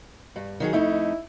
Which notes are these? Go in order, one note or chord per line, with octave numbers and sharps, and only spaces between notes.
G2
D#3 F#3 G#4
F2 A3 D#4 E4